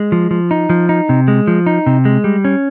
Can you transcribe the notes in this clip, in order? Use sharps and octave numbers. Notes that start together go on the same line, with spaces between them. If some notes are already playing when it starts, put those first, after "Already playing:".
Already playing: G#3
F3
F3
D#4
F3
D#4
C3
G#3
F3
D#4
C3
G#3
G3
C#4